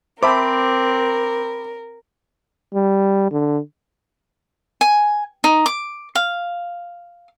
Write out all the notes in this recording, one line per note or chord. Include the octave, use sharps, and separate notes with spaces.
C4 A#4 C5 E5 A5 B5 D6
G3
D3
G#5
D#4
D6
F5